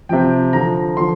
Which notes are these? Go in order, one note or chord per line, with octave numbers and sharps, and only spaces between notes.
C3 F3 G5
D3 F3 A#5
D3 F3 C6